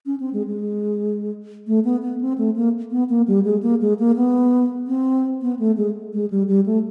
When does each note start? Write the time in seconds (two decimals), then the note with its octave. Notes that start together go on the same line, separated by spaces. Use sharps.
0.06 C#4
0.20 C4
0.33 G#3
0.47 G#3
1.67 A3
1.85 B3
2.02 B3
2.21 C4
2.38 A3
2.56 A#3
2.91 B3
3.09 A#3
3.28 G3
3.45 G#3
3.62 A#3
3.81 G#3
3.99 A#3
4.16 B3
4.87 C4
5.42 B3
5.59 A3
5.77 G#3
6.13 G#3
6.30 G3
6.48 G3
6.66 A3